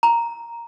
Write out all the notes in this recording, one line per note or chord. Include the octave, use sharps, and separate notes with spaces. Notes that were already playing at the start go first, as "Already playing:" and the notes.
A#5